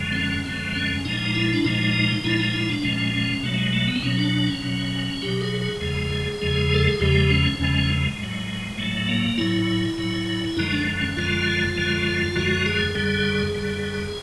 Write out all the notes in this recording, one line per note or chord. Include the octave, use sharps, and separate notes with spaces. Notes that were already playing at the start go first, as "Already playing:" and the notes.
Already playing: F#2 D3 F3 G#3
C4
C#4
F#2 D3 F3 G#3 C4
C#4
A#2 F3 G#3 D#4
E4
D4
A#2 F3 G#3 D#4
A#2 F3 G#3 E4
D#4
E4
D4
A#2 F3 G#3 C#4
C#4
B2 F#3 A3
A3
G#3
A3
B3
C4
B2 F#3 C#4
D4
D4
C#4
B2 F#3
B2 F#3 G4
G#4
G#4
E2 C#3 F3 G#3
E2 C#3 F3 G#3
A4
G#4
E2 C#3 F3 G#3 G4
C#4
E2 C#3 F3 G#3 C#4
G#3
A2 F#3
A2 F#3 A3
A#3
A2 F#3 E4
A2 F#3
F#2 D3 F3 G#3 D#4
D4
C#4
F#2 D3 F3 G#3 F4
F#2 D3 F3 G#3
F#2 D3 F3 G#3 F#4
G#4
F#2 D3 G3 G#4
F#2 D3 G3